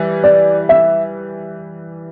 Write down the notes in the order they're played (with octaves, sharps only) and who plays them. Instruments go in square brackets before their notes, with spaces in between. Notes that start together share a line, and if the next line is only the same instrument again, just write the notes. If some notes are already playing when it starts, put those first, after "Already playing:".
Already playing: [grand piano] E3 G3
[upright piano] D5
E5